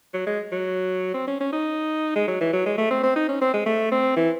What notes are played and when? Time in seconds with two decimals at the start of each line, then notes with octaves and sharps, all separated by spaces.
0.14 F#3
0.26 G#3
0.52 F#3
1.14 C4
1.27 C#4
1.40 C#4
1.53 D#4
2.16 G#3
2.28 F#3
2.41 E3
2.53 F#3
2.66 G#3
2.78 A3
2.91 C4
3.03 C4
3.16 D#4
3.28 C#4
3.41 C4
3.54 G#3
3.66 A3
3.92 C4
4.16 E3